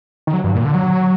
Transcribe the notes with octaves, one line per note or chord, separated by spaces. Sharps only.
D#3
F#3
G2
A#2
D3
F#3